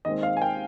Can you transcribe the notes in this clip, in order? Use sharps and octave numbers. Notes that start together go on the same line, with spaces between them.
D#2 D#3 G#3 C4 D#5
F5
G#5
G5